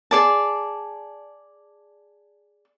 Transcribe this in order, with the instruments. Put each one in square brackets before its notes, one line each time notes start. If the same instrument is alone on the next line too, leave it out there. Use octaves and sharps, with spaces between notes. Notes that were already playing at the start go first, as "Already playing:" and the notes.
[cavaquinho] G#4 D5 A5